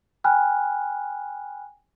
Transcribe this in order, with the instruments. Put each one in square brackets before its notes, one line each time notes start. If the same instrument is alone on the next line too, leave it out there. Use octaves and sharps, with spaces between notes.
[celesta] G5 G#5 B5 F6 F#6